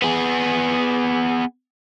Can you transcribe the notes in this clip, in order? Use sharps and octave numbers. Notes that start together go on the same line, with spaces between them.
B3 G#4